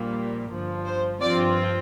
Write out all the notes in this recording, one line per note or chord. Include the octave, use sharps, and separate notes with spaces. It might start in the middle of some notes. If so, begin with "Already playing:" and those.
Already playing: A#1 A#2 G3 A#3
G1 G2 F3
C5
G2 F3 C4 F4 D5